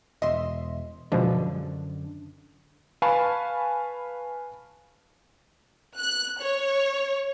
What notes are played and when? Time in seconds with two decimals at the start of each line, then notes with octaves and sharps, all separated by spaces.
0.22 E1 D#5 E5 C6
1.12 F#2 B2 D3 F3 G#3
3.02 B4 F5 G#5 A5 B5 C#6
5.97 F#6
6.40 C#5